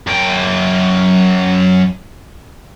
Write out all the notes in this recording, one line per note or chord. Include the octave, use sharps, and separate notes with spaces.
F#2 G5